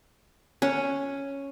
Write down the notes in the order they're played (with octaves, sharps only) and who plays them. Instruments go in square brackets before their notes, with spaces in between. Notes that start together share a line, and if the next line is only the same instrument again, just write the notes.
[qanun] C#4